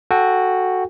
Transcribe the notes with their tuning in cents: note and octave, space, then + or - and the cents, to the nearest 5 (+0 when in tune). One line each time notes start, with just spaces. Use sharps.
F#4 +0 A4 +0 G5 +20